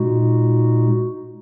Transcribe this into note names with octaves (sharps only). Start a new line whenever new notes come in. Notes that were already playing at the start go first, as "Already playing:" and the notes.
Already playing: A#2 G#3 D#4 F#4